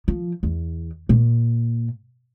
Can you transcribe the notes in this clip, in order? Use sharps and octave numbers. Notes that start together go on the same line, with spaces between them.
F3
E2
A#2